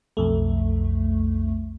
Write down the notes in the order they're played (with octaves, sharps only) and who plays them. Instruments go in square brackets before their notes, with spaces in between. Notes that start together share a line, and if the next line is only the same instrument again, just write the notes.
[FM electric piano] B1 F2 A3